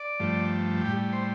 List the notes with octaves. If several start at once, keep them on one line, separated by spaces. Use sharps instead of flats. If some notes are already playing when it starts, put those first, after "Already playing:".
Already playing: D5
G2 F3 A3
A2 G3 G4
C5